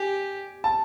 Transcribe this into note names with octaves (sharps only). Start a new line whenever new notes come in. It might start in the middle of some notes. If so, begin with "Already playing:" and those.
Already playing: G4 G#5
A5